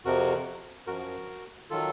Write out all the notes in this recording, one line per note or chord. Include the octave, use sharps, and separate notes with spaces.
F2 C3 F3 F#4 A#4
F#2 F3 F#4 A#4
D#3 F#3 F4 A4